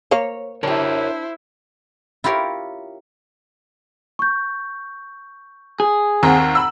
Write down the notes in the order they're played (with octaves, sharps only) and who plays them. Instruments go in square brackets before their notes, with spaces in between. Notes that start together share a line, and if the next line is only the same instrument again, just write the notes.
[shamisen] A#3 F5 [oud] C#5
[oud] D4 G4 [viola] E4 C5 [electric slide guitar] A#4 C#5 A5
[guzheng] E4 F4 G4 A#4 C#5
[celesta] C#6 G6
[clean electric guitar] G#4
[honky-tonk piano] D#2 C4 [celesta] F#5 A#5
[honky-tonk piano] B5 E6